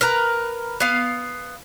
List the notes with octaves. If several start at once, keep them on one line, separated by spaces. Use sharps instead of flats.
A#4 B4 A#5
B3 F5